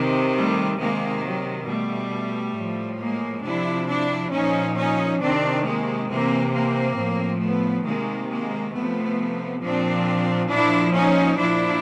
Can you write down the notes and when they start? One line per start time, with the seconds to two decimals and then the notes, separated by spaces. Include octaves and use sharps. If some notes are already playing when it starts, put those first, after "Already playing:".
Already playing: C3 D#3
0.35 G3 A3
0.79 C3 D#3 G#3 A#3
1.24 F#3
1.67 B2 G3 A3
2.56 A2 F3
3.00 G#3 A#3
3.44 C3 F3 D4 E4
3.88 D4 E4
4.32 A#2 F3 C#4 D#4
4.76 C#4 D#4
5.21 C3 D#3 C4 D4
5.65 G#3 A#3
6.09 C3 E3 A#3 C4
6.53 A#3 C4
6.98 A2 F3
7.41 A3 B3
7.86 C3 D#3 G#3 A#3
8.30 G#3 A#3
8.74 C3 F3 A3 B3
9.62 A#2 F3 C4 D4
10.50 A#2 F3 D4 E4
10.95 C#4 D#4
11.38 A#2 F3 D4 E4